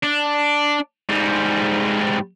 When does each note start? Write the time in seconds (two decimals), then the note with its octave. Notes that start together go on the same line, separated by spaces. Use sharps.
0.03 D4
1.09 G#2 G3